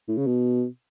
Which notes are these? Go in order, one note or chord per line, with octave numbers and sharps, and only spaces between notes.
A2
C#3
B2